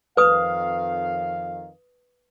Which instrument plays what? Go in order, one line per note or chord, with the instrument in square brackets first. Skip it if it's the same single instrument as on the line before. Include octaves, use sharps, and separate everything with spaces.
[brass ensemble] F2 D#3 F5 [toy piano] B4 D#6